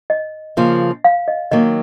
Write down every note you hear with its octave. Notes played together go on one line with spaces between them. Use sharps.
D#5
C#3 F3 A#3 F4
F5
D#5
D#3 F#3 A#3 D#5